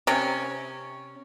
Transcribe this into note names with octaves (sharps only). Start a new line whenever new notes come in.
C3 C#4